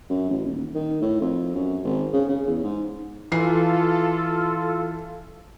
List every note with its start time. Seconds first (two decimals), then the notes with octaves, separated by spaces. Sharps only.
0.10 F#2
0.29 A1
0.46 D#1
0.75 D#3
1.02 A2
1.21 F2
1.55 F#2
1.84 G#1
2.13 C#3
2.29 C#3
2.47 E2
2.64 G#2
3.32 E3 F4 A4 C7